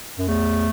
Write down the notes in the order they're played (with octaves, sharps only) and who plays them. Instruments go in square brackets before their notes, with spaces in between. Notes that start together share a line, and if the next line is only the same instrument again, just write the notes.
[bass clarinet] F#2
[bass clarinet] E2 [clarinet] A3